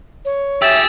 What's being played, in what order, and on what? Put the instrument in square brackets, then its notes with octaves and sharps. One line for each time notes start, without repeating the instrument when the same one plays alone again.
[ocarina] C#5
[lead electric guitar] G4 G#4 [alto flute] E5 [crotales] E6 A6 E7